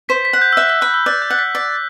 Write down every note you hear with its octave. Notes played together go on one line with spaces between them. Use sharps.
C5 B6
B6
F#5
G6
E6
E5 F#6
E6
B5 F#6
E6
D5 F#6
G6
F#5
B6
D5